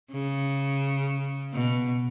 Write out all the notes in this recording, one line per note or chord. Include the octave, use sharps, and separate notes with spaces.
C#3
B2